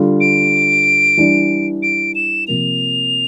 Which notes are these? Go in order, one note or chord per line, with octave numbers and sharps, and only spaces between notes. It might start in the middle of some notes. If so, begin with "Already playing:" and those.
Already playing: D3 G3 D4 F4
D7
E3 G3 D4
D7
E7
C3 F3 A#3 F7